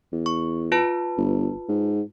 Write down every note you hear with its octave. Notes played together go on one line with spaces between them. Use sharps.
E2
C#6
F4 B4 A5
G1
G#2